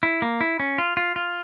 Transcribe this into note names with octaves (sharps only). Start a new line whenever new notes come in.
E4
A#3
E4
C#4
F4
F4
F4